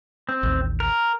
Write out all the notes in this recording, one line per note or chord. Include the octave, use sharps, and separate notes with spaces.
C4
A1 D#2
A#4